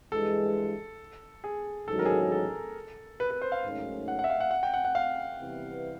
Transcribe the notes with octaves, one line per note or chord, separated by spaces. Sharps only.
G2 E3 G#3 A4
G#4
A1 G#2 D#3 F#3 A4
A#4
G#4
A4
G#4
A4
B4
B4
C5
F5
G#2 D#3 F#3 A3 C#4
F#5
F#5
E5
F5
F#5
F#5
G5
F#5
F#5
F5
C3 E3 G3 B3